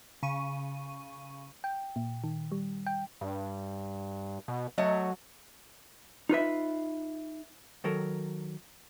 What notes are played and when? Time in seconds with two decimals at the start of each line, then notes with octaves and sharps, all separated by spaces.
0.23 C#3 C#6 D#7
1.64 G5
1.96 A#2
2.24 D#3
2.52 G3
2.87 G5
3.21 G2
4.48 B2
4.78 F#3 A3 C#5 D#5
6.29 D#4 F4 B4 E5
7.84 D#3 F#3 A4 A#4